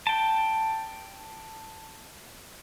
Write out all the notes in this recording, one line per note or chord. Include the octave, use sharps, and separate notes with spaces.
G5 A5